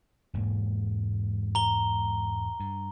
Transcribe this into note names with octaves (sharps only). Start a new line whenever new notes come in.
E1 G#2 A#3
A#5 G7
G2